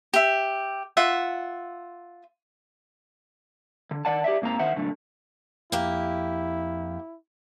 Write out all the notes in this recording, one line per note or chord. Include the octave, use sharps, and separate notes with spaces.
G4 E5
F4 E5 F#5
D3
D#3 D5 F#5 A5
G4 D5 E5
G#2 A#3 C4 A#5
D#3 C5 E5 F#5
F#2 A#2 D3 A3
F2 A#3 E4 G4